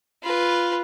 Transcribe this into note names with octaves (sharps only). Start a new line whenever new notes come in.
F4 B4